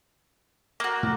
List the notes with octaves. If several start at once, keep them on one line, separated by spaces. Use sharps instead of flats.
A#3 F#4
A2 A3